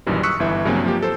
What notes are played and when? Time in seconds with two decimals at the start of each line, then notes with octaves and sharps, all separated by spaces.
0.06 A#1 F#2 D#3 E3 G3
0.23 C#6 D#6 E6 F#6 B6 C#7
0.40 G1 E3 E5
0.65 G2 C#3 F#3 A#3 C4 C#4
0.84 F3 A#3 G4
1.03 A4 C5